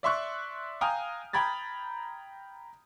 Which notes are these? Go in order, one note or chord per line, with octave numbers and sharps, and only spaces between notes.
D5 E5 C6 C#6 F#6
F5 G5 G#5 A#5 D#6 F6
G5 A#5 B5 G#6 A6